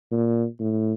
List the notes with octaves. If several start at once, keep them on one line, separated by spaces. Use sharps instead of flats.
A#2
A2